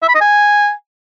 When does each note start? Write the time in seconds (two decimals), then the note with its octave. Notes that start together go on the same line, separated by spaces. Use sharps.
0.02 E5
0.08 B5
0.15 D#5
0.21 G#5